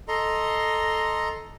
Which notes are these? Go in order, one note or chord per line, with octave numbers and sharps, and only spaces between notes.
A4 D#5 A#5 C6